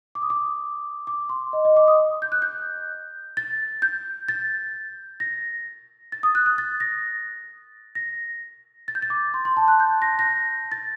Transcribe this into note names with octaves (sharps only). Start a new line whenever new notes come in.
D6
D#6
D6
D6
C6
D#5
D#5
D6
D#6
G6
F#6
G6
A6
G6
A6
A#6
A6
D#6
F#6
F#6
A6
A#6
A#6
A6
G6
A6
D6
C6
C6
A5
F#6
G6
A#6
A#6
A6